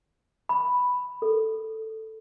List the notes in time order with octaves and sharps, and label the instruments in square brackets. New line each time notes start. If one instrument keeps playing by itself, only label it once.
[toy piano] B5
A4